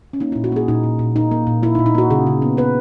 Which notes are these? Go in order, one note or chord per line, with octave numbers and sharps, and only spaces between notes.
C#4
A#3 D#4
E4
A#2
F#4
A#3 G#4
A#2 D#4
A#2
A#2
A#3 D#4
A#3
A#2
A#3 E4
D#4
A#2
D#4
A#3 F#4
C#3 G#4
C#3
B3
B3 B4